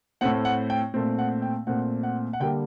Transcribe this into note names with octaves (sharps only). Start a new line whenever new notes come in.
A2 A3 C4 F#5
F#5
G5
A#2 A3 C4
F#5
G5
A#2 A3 C4 F#5
F#5
F#5
D3 G3 A#3 G5